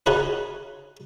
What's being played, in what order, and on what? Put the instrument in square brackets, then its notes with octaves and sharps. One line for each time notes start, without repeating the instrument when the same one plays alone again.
[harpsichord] D#4 F4 F#4 G#4 B4 C#5